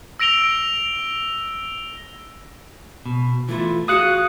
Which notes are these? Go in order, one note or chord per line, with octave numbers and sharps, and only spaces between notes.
E6 A#6 D7 F7 G7
B2
E3 A3 E4 F4
F#4 G#4 F5 D#6 F#6 C#7